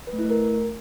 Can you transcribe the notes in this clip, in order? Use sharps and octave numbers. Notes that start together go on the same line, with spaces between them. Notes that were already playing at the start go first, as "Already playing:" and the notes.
B4
A3
E4
A3
A#4